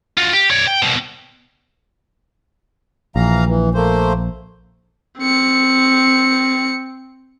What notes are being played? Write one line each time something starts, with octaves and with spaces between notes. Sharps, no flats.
F4 F#4
G4
C#5 D5
G5
C2 B2
A#1 E3 F5 A#5
E3
A3 A#3 C5
C4 C#7